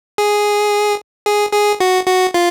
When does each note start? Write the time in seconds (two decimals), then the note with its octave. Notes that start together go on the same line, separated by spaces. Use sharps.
0.18 G#4
1.26 G#4
1.53 G#4
1.80 F#4
2.07 F#4
2.34 F4